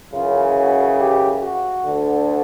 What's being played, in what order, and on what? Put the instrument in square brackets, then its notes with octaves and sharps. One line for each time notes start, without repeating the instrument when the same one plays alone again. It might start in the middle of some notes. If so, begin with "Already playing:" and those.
[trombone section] F#2 C#3 E3 F4
F#4
G4
F#4
D2 D3